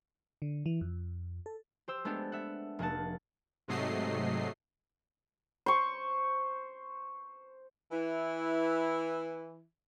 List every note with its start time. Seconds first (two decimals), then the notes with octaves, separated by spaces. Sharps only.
0.42 D3
0.66 E3
0.81 F2
1.46 A4
1.88 G4 C5 E6
2.05 G#3 A3 B3 D4 G4 A4
2.32 E5 F#5
2.79 F1 A#3 G#4 F#5 A5
3.68 G#2 C3 F#3 A3 D#5 C7
5.66 C5 C#6
7.92 E3 E4